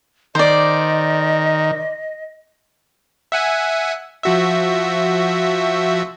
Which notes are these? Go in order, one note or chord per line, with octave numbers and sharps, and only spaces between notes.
D#3 C5 D5 D#5
E5 F#5 G#5
F3 F#4 E5